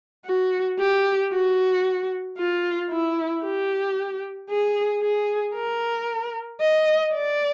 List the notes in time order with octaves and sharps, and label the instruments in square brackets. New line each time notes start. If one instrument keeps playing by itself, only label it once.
[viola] F#4
G4
F#4
F4
E4
G4
G#4
G#4
A#4
D#5
D5